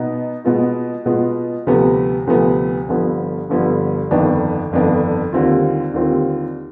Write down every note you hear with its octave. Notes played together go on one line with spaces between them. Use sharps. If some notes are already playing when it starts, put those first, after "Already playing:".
Already playing: B2 B3 D#4
B2 G#3 B3 F4
B2 G#3 B3 F4
D2 C3 F3 B3
D2 C3 F3 B3
G1 G2 D3 F3 B3
G1 G2 D3 F3 B3
G1 F2 D#3 B3 D4
G1 F2 D#3 B3 D4
D#2 D3 G3 C4 F4
D#2 D3 G3 C4 F4